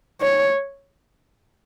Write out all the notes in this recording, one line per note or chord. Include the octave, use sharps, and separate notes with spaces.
C#5